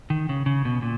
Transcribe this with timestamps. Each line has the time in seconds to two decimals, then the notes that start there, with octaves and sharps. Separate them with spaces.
0.10 D#3
0.29 C#3
0.46 C#3
0.65 B2
0.82 A#2